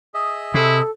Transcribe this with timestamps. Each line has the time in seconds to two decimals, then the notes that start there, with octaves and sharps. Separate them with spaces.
0.14 G#4 D#5 E5
0.54 C3 E4 A4